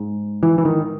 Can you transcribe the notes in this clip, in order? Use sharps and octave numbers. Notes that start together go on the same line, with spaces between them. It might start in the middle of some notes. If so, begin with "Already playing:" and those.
Already playing: G#2
E3
E3
D#3